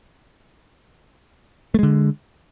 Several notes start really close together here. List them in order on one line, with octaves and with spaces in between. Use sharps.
A3 G#3 D3